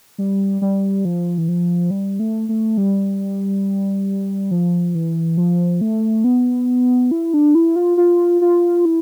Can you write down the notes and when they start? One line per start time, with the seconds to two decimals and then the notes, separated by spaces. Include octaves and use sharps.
0.18 G3
0.62 G3
1.05 F3
1.38 E3
1.48 F3
1.91 G3
2.19 A3
2.49 A3
2.77 G3
4.51 F3
4.95 E3
5.37 F3
5.81 A3
6.24 B3
7.11 E4
7.34 D4
7.55 E4
7.76 F4
7.97 F4
8.41 F4
8.85 E4